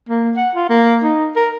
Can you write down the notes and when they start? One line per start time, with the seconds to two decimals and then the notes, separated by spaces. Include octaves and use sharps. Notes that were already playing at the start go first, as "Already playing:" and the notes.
0.09 A#3
0.36 F#5
0.55 F4
0.69 A#3
1.03 D#4
1.36 A#4